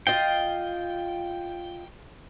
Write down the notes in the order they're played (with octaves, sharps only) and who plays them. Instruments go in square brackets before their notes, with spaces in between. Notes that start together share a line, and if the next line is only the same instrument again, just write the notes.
[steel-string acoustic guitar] F4 D#5 F5 [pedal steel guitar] G5